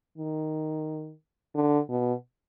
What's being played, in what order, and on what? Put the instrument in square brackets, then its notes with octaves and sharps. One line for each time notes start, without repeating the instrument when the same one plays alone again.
[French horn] D#3
D3
B2